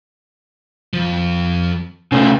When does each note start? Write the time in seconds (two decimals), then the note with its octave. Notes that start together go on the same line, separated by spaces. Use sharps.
0.93 F2 F3
2.12 C2 C#3 A3 B4